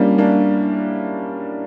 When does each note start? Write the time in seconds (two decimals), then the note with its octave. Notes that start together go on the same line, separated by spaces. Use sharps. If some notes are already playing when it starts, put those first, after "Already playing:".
Already playing: G3 A#3 C#4 D4 E4
0.18 A#3 D4